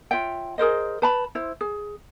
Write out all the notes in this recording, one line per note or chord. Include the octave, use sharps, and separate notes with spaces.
F4 C#5 E5 G5
G#4 A#4 C5 D#5
B4 A5 B5
E4 C5
G#4